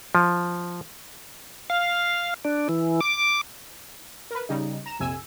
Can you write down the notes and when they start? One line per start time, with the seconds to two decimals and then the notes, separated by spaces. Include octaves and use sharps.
0.15 F3
1.70 F5
2.45 D4
2.69 E3
3.01 D6
4.31 A#4 B4
4.49 C#3 G3 D#4
4.86 A#5 E7
4.99 A#1 F2 C3 G#5 E6